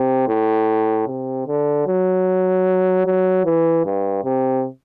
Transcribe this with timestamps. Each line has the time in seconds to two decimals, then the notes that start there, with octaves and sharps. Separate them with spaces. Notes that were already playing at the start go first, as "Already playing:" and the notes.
Already playing: C3
0.28 A2
1.08 C3
1.47 D3
1.87 F#3
3.06 F#3
3.45 E3
3.85 G2
4.24 C3